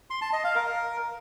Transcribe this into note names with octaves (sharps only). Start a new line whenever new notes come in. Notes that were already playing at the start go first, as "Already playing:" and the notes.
C6
A5
D#5
F5
A#4